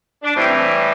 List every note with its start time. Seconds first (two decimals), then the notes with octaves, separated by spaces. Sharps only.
0.23 D4
0.34 A2 E3 G3 C4